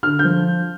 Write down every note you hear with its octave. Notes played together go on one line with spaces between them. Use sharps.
D3 F6
G6
F3